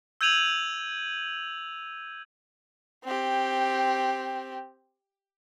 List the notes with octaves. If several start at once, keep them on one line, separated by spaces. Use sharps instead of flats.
E6 G6 G#6 D#7 F7 F#7
C4 G4